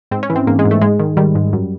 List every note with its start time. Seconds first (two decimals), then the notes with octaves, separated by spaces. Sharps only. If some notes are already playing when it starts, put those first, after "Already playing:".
0.11 G#2 C4
0.23 C#4
0.30 E3
0.36 C4
0.47 G#2 A#3
0.59 G#3
0.65 G#2
0.71 A3
0.81 G#2 G#3
1.00 D#3
1.17 D#3 G3
1.35 G#2
1.53 F#2